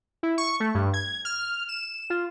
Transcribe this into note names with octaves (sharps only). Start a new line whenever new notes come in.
E4
C#6
A3
G2
G#6
F6
E7
F4